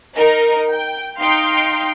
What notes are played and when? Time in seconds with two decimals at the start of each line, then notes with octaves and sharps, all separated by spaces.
0.16 D#4 A#4
0.73 G5
1.20 D#4 F5 G5 C6